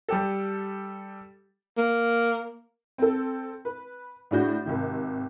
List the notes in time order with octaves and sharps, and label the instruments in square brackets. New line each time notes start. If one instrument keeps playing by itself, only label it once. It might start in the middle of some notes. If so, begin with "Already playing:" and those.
[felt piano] G3 G4 A4
[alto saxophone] A#3
[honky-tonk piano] C4 A4
B4
A2 G#3 D4 F#4 G6
G#1 C3 D#3